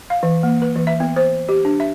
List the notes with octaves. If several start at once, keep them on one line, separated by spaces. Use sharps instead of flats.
F5
E3
A#3
B4
E3
E5
B3
C5
G4
D4
E5